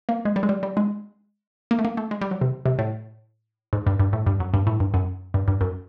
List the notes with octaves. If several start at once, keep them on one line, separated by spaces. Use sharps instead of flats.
A#3
G#3
G3
G#3
G3
G3
G#3
A#3
A3
A#3
A3
G#3
G3
F#3
C3
C3
A2
G#2
G2
G2
A2
G2
F#2
G2
A2
G2
F#2
G2
G2
F#2